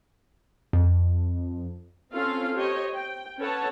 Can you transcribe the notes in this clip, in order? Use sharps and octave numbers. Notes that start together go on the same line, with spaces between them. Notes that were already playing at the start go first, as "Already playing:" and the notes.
F2
C4 C#4 F4 A4 F5
G4 C5 C#5 D#5
G5
C#4 A4 B4 C#5 F#5 A5